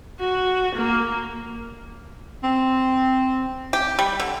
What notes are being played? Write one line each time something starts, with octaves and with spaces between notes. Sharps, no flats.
F#4
A#3
C4
G4
G3
D3